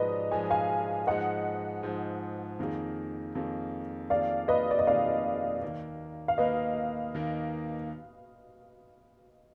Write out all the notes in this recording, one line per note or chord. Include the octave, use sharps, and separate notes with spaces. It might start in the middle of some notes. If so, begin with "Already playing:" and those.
Already playing: G#2 F3 G#3 B4 D5 D#5
G#2 F3 G#3 G#5
F5 G#5
G#2 F3 G#3 D#5 F#5
G#2 F3 G#3
F2 D#3 A#3 F4 G#4
F2 D#3 A#3 F4 G#4
F2 D#3 A#3 F4 G#4 D5 F5
B4 D#5
D5
D#5
F2 D#3 A#3 F4 G#4 D5 F5
D#2 D#3 A#3
F5
D#2 D#3 A#3 B4 D#5
D#2 D#3 A#3